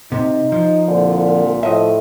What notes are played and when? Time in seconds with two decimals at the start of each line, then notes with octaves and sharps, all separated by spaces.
0.12 C3 D#4
0.52 F3
0.88 C2 A#2 D3
1.63 A2 F3 D#5 E5